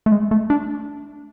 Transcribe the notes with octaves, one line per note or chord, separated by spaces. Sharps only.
A3
G#3
A3
D4